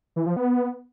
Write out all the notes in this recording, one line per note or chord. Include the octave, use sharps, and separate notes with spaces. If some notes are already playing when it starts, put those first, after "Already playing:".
E3
F3
B3